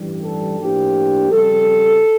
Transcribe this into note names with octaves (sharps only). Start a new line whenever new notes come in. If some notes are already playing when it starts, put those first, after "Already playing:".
Already playing: A1 G2 E3 G3
A4
A2 F3 A#3 D4 G4
F2 C#3 G3 A4